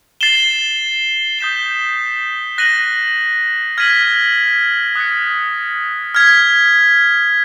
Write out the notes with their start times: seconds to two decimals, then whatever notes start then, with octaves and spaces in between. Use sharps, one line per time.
0.21 A6 C7 E7 G7
1.39 D#6 G6 B6 E7 G7
2.58 F#6 A#6 D#7 F#7
3.78 F6 G#6 B6 D#7 F#7
4.96 D#6 F#6 A6 C#7
6.15 F6 G#6 B6